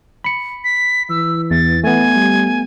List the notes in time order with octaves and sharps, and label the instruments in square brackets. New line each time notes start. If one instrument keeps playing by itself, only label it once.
[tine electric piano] B5 C#7
[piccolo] B6
[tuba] E3 [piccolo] E6
[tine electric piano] E2 [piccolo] A6
[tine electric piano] A3 B3 [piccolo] G#5
[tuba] G3